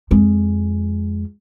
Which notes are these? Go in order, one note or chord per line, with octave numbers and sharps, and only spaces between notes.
F2 G#3